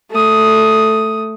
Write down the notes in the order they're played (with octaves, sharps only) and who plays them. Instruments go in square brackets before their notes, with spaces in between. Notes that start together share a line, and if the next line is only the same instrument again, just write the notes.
[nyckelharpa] A3 D#6